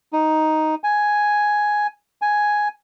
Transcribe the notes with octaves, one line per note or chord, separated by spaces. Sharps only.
D#4
G#5
G#5